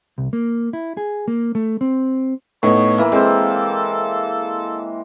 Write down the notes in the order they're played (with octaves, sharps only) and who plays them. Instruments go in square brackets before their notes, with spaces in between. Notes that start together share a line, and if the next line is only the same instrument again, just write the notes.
[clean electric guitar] C2
A#3
E4
G#4
A#3
A3
C4
[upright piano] A2 B3 D#4 [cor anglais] C#5
[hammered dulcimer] E3 A#3
[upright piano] G#3 [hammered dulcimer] C4 C5 [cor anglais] A4